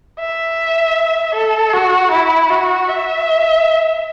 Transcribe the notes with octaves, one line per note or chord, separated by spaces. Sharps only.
E5
A4
F#4
E4
F#4
E5